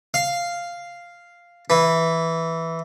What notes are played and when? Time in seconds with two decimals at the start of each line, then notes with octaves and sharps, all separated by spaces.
0.14 F5
1.70 E3